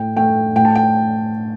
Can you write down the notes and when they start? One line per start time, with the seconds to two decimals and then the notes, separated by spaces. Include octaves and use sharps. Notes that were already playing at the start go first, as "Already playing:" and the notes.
Already playing: A2 G5
0.16 A3 G5
0.56 A2 G5
0.65 A5
0.75 G5